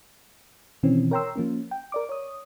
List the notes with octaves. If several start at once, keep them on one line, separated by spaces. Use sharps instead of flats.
B2 D#3 E3 C4 C#4
A#4 C#5 G5 A#5 C6 E6
F3 A#3 C#4
G5
A#4 D5 D6
C#5 D#6